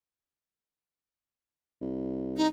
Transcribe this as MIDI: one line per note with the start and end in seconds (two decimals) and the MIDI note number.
1.81 2.49 36
2.37 2.47 63